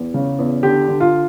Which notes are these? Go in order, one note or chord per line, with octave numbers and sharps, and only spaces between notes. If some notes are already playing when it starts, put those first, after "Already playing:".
Already playing: E2
C#3
E2
D3 G4
D3
F4